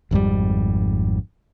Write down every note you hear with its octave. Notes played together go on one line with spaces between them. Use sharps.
G#1 F2 G#2 G3